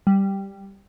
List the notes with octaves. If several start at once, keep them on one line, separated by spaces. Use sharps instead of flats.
G3